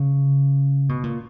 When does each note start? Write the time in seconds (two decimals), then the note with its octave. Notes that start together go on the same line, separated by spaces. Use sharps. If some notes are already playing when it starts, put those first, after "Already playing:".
Already playing: C#3
0.89 B2
1.04 A#2